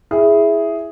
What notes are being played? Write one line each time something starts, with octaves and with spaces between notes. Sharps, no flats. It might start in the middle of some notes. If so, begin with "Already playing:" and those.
E4 G#4